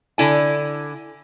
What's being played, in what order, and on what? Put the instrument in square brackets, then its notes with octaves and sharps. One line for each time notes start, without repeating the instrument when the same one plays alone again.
[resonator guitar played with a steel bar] D3 E4 G#5